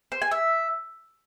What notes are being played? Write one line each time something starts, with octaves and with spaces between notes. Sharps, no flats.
C5
G#5
E5